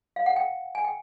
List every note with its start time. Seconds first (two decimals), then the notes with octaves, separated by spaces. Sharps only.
0.16 F5
0.26 F#5
0.36 G5
0.75 G#5
0.84 G5